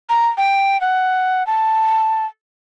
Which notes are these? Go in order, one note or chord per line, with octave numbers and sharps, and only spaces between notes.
A#5
G5
F#5
A5